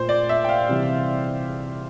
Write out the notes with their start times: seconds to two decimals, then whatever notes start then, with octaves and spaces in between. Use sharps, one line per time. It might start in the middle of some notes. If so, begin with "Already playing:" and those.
Already playing: A#2 A3 F4 C5
0.09 D5
0.29 E5
0.44 G5
0.49 F5
0.69 C3 E3 G3